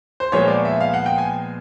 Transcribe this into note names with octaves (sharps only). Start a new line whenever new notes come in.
C5
A#2 F3 G#3 B3 C#5
D5
E5
F5
F#5
G5
G#5